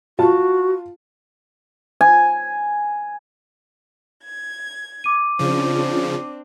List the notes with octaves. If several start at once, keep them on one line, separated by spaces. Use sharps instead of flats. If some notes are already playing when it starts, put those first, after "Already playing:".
F4 F#4 A5
G#5
G#6
D6 D#7
C#3 F3 C4 D4